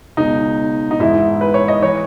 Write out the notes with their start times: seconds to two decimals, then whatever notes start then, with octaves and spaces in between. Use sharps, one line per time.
0.17 C#2 B2 D#4
0.91 D#4
1.00 G#2 E3 E4
1.41 B4
1.54 C#5
1.68 D#5
1.82 E3 C#5